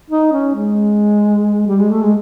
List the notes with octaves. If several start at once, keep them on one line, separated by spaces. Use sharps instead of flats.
D#4
C#4
G#3
G3
G#3
A3
G#3